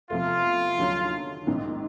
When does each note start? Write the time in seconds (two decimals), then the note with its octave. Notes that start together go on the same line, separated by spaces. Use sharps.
0.10 E2 C3 F3 A3 F4
0.79 D#2 D3 F#3
1.47 A#1 G#2 D#3